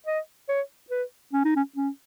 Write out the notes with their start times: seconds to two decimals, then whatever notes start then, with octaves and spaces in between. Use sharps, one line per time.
0.06 D#5
0.49 C#5
0.90 B4
1.33 C#4
1.45 D#4
1.56 C#4
1.76 C#4